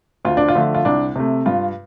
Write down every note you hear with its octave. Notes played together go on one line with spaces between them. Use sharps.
D2 F4
D4
F4
D3 F3 A3
F4
C2 D4
C3 A3
G2 F4